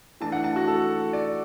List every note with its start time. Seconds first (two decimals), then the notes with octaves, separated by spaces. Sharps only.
0.21 E3 A3 D4 A5
0.32 F#5
0.44 A5
0.56 F#4
0.67 A4
1.13 D5